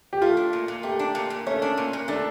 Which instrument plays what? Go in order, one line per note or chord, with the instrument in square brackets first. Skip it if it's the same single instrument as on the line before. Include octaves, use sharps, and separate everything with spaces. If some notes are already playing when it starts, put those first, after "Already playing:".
[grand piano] G4
[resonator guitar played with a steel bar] A3 [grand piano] F4
[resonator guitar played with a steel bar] D4
A#2
A#2
[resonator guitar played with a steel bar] A3 [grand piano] G4
[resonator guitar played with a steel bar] D4
A#2
A#2
[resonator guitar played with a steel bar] A3 [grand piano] C#4
[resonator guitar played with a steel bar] D4
A#2
A#2
[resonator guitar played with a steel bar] A3 [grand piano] D4